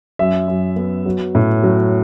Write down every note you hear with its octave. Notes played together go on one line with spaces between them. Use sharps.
F#2 E5
F#2
B3
F#3
A2
F#3